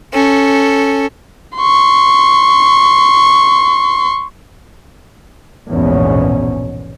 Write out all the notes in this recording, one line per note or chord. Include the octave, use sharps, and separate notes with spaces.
C#4 A4
C6 C#6
A#1 E2 G#2 B2 C#4